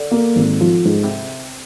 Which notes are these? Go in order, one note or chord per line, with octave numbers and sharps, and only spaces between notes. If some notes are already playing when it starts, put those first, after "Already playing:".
Already playing: D3
A#3
G#1
F3
G#2
C3